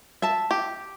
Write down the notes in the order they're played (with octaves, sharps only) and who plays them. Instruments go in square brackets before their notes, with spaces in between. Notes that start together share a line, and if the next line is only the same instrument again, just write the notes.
[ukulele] E5 A5
[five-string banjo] G4